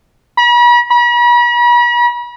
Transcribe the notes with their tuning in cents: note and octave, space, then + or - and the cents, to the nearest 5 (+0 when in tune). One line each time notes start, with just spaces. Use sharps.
B5 -45
B5 -45